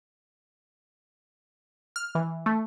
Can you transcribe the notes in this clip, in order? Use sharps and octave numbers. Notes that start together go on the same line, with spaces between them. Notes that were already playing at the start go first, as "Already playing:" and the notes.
F6
E3
A3